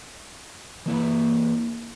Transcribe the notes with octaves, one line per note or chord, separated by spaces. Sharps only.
E3 A#3 E4 B4